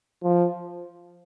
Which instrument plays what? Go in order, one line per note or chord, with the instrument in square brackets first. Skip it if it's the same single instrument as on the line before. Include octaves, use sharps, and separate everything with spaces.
[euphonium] F3